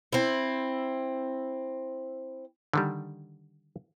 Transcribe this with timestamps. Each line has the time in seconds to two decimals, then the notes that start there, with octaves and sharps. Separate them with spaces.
0.13 C4 E4
2.73 D3 D#3 G3